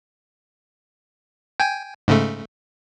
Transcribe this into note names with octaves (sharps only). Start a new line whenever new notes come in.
G5 G#5
G#2 C#3 A3